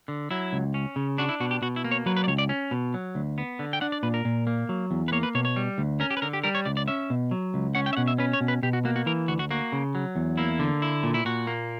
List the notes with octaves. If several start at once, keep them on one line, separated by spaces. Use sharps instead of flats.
D3
F#3 E4
C#2
C#4
C#3
D4 F#4
E4
B2 F#4
G4
B2 F#4
E4
A#3
C#5
F#3 B4
B4
D5
C#2 C#5
D5
C#4
B2
F#3
D2
B3
D3
G5
D4 F#5
D5
A#2 B4
A#4
A#2
A#3
F#3
E2
B4
A#3 C#5
B4
B2 C#5
C#5
G3
D2
C#4 A#4
G4
B4
D3 A#4
G4
G3 A#4
C#5
C#2 D5
D5
C#4 E5
B2
F#3
C#2
C#4 F#5
G5
E5
B2 F#5
E5
C#4 B4
C#5
B2
B4
B2 G4
F#4
A#3 F#4
F#4
E3 A#4
D2 F#4
F#4
A#3 F#4
C#3
F#3
E2
A#3 E4
D3
E4
A#2
E4
A#2 F#4
A#3